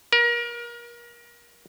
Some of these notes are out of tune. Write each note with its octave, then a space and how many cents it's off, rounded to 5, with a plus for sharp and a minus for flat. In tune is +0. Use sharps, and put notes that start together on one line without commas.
A#4 +30